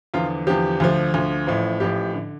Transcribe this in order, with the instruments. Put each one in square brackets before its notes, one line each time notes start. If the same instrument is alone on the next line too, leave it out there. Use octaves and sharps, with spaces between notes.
[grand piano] E2 D3 F3 F4
E2 D3 F3 G4
D2 D3 F3
D2 D3 F3
A1 A2 F3
A1 A2 F3 G4
D3